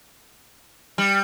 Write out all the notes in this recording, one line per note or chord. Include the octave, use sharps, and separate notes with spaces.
G3